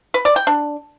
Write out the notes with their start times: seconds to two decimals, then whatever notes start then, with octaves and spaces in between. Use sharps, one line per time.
0.14 B4
0.25 D5
0.36 G5
0.47 D4